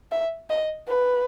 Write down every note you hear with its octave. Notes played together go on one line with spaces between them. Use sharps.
E5
D#5
B4